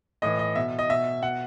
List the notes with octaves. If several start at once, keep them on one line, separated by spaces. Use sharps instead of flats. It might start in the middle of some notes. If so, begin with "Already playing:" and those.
A2 E3 D#5
D#5
B2 E5
D#5
B2 E5
B2 F#5